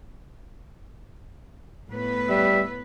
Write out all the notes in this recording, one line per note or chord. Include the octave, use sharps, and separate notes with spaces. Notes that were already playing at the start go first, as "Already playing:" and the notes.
A2 B3 B4
G3 E5